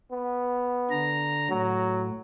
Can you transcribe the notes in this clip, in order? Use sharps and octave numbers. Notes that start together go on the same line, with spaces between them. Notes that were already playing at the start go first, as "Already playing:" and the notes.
B3
D3 A#5
A2 F#3